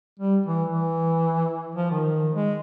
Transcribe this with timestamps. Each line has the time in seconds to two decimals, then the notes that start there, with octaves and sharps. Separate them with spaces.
0.19 G3
0.46 E3
0.69 E3
1.76 F3
1.91 D#3
2.34 G#3